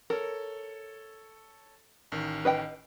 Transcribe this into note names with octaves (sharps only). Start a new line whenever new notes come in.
A4 A#4 C#5
A1 D#3
B4 D#5 G5